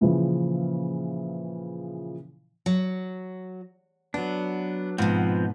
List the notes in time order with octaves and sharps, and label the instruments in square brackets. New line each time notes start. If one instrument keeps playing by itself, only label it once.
[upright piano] A#2 C#3 E3 F3
[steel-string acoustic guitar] F#3
[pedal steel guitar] F#3 D4 [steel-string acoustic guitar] B3
[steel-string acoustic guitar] G#2 B2 [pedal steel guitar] F3 B3 C4